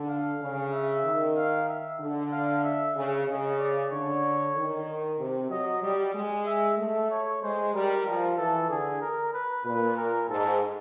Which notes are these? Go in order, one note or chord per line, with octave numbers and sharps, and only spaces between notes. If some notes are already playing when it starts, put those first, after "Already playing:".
Already playing: D3
F5
C#3
E5
D#3
F5
E5
D3
F5
E5
C#3
C#3 D#5
D5
D3 C#5
D#3
C3
F#3 D#5
G3 D#5
G#3
E5
A3 E5
C#5
G#3 C5
G3 A#4
F3
E3 A4
D3 G#4
A#4
B4
A#2 B4
A#4
G#2 A4